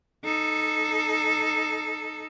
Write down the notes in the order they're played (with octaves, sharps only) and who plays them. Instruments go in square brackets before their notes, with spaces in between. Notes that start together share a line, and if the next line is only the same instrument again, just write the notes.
[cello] D#4 A4